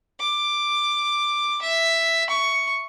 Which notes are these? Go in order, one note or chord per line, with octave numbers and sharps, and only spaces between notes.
D6
E5
C#6